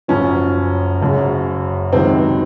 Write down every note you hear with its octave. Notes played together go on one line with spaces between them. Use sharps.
F#1 F#2 F3 C#4
F#1 F#2 C#3
C#2 C3 D#3 F#3 C4